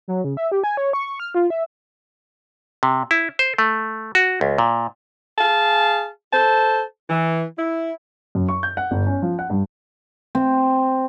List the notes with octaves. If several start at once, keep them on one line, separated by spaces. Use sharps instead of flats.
F#3
C#3
E5
G4
G#5
C#5
C#6
F6
F4
E5
C3
E4
C5
A3
F#4
C#2
A#2
G#4 F5 G#5 A5
A4 C5 A5
E3
E4
F#2
C#6
G6
F#5
G1
C#4
F3
F#5
G2
C4